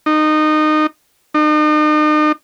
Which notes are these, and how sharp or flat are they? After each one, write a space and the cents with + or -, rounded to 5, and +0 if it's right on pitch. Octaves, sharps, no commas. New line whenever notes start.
D#4 -20
D#4 -40